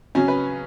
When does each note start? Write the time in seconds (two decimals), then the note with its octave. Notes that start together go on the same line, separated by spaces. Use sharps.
0.15 C#3 F#3 C#4 G#5
0.28 B4